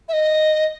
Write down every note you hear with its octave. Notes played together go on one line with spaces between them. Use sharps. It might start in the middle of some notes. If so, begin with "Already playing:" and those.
E5
D#5